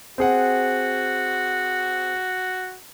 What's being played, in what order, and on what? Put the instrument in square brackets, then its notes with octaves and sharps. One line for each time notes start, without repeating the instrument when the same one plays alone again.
[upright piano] C4 G#4 F#5 [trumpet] F#4